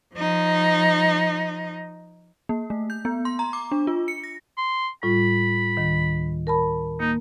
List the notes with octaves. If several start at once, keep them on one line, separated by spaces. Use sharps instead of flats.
F3 D#4
A#3
A3
G6
B3
C6
A#5
D6
D4
F4
C#7
A#6
C6
A2 G3 F4 B5
D2 D#3
A#4 A5 B5
A#3 D#4